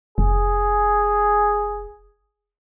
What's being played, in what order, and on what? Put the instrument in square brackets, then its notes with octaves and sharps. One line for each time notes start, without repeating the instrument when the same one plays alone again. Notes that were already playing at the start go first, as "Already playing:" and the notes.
[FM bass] F1 [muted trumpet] G#4